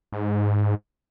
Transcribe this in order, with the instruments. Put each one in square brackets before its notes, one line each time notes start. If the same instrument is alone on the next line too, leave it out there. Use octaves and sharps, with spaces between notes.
[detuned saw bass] G#2